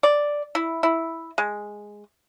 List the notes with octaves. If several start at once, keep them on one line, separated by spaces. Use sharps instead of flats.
D5
E4
E4
G#3